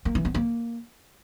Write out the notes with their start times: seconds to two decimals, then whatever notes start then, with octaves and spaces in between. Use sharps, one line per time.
0.05 A#3
0.15 E3
0.25 B3
0.34 A#3